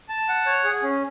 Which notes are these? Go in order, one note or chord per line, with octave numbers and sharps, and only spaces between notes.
A5
F#5
C#5
G#4
C#4